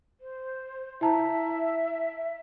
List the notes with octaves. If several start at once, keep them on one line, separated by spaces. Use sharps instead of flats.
C5
E4 E5 A5 A#5